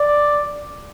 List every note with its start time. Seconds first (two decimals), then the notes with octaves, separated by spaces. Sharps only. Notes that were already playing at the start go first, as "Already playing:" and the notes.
Already playing: D5